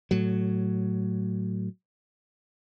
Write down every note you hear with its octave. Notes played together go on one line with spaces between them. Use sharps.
A2 F#3